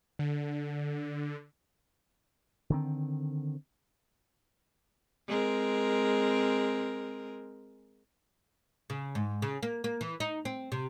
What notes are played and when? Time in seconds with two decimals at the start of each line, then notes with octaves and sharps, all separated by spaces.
0.19 D3
2.70 D3 D#3 C4
5.28 G#3 C4 A#4
8.90 C#3
9.15 G#2
9.42 C#3
9.63 A#3
9.84 A#3
10.01 E3
10.20 D#4
10.45 C4
10.72 C3